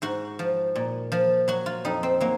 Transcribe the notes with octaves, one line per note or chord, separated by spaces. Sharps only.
G#2 F#4
F3
A#2
F3
F#3 F#4
F4
F2 D#4
C4
F#3 A#3